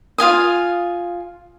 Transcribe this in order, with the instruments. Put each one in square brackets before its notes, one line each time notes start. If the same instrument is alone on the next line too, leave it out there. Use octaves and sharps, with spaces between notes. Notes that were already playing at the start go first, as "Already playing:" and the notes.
[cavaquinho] F4 F5 G#5 D#6